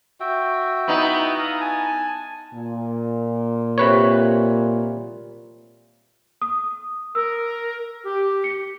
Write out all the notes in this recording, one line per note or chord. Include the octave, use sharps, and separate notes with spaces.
F#4 E5 G5
B3 D#4 E4
F5 A#5 D#6
G#5 A5
A#2
C3 B4 C#5
D#6
A#4 E6
G4
C#7